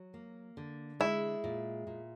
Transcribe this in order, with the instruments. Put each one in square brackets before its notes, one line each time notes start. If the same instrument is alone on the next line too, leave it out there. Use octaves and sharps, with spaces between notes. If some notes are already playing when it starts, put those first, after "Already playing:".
Already playing: [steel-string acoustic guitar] F#3
A#3
D3
[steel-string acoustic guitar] G#3 [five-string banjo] E4
[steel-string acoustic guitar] A#2
A#2